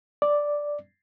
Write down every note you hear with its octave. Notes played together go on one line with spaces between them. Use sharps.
D5